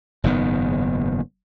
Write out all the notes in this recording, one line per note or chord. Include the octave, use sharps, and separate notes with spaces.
F#1 G#2 D#3 B3